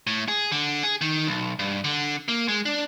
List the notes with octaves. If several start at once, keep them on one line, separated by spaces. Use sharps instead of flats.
A2
G#4
D3
G#4
D#3
B1
G2
D3
A#3
G#3
D4